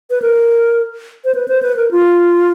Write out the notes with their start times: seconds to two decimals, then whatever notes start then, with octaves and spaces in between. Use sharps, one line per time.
0.10 B4
0.22 A#4
1.25 C5
1.35 B4
1.48 C5
1.63 B4
1.76 A#4
1.91 F4